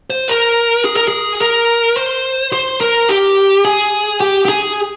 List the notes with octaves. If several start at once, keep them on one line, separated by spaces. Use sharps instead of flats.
C5
A#4
G#4
A#4
G#4
A#4
C5
C5
A#4
G4
G#4
G4
G4
G#4